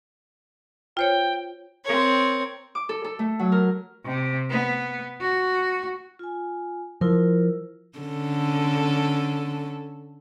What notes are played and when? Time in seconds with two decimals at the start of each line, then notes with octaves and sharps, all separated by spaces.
0.97 F4 C5 C#5 G5
1.84 C4 A#4 C#5
2.75 D6
2.89 A4
3.04 A4
3.19 A3
3.40 F#3
3.52 A#4
4.05 C3
4.50 B3
5.21 F#4
6.19 F4 G#5
7.01 F3 E4 F4 A#4
7.99 D3 C#4 A4